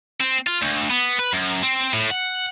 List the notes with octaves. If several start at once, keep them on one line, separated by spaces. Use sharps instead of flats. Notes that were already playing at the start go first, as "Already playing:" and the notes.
C4
F4
D2
B3
B4
F#2
C4
A2
F#5